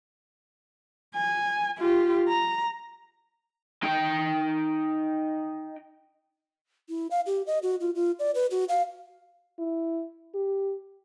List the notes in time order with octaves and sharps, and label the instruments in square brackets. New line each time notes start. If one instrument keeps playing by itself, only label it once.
[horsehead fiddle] G#5
F4 G4
A#5
[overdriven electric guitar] D#4 G5
[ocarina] E4
F5
G4
D#5
F#4
F4
F4
D5
B4
F#4
F5
[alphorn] E4
G4